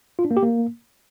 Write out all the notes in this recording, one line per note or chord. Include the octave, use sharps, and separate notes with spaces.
F4
D4
A#3
G4
A#3